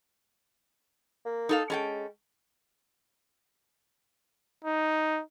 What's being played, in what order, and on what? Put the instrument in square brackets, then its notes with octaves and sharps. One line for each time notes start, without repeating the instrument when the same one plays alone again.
[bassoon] A#3
[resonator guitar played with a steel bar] D#4 A4 F5
[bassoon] G#3 [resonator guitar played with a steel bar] C#4 A4 G5
[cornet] D#4